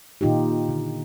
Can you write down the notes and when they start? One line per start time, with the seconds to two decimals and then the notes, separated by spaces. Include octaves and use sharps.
0.21 A#2 D#3 D#4 F4 G4
0.69 D3